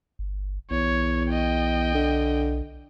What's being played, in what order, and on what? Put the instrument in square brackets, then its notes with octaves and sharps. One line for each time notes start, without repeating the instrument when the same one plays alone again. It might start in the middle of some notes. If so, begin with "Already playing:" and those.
[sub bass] G1
[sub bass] B1 [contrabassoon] E2 [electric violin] C#5
[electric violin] D#5 G5
[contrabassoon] D3